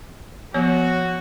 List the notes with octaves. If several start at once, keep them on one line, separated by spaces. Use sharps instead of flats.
F3 B3 F#4 C#5